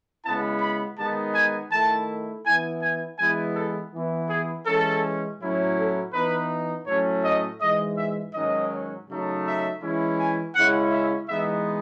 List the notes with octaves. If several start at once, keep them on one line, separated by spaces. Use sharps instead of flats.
C#3 G#3 B3 E4 A5
B5
D#3 G#3 B3 D#4 A5
G#5
D#3 A3 E4 A5
E3 B3 E4 G#5
G#5
E3 G#3 B3 E4 G#5
A4
E3 B3 E4
G#4
E3 G#3 C#4 A4
A2 F#3 C#4 E4
A4
E3 B3 D#4 B4
A2 F#3 A3 C#4 C#5
D#5
G#2 E3 G#3 D#5
E5
G#2 D#3 F#3 C#4 D#5
C#3 F#3 A3 D#4
E5
E3 G#3 C#4 E4
G#5
C#3 G#3 C#4 E4 F#5
E5
E3 G#3 B3 D#4 E5